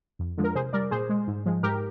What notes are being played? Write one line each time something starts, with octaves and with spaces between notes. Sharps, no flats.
F2
D3 F3 G#3
A#4
C3 G#4 C5
G3 A#4 D5
A#2 G#4 C5
G#3
G#2
F3 G#3
G#2 G4 A#4